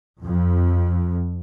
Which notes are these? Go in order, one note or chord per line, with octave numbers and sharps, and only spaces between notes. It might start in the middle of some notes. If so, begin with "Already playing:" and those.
F2